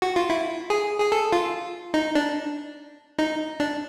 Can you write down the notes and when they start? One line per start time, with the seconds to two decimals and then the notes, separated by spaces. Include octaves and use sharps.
0.02 F#4
0.16 F4
0.30 E4
0.70 G#4
1.00 G#4
1.12 A4
1.32 F4
1.94 D#4
2.15 D4
3.19 D#4
3.60 D4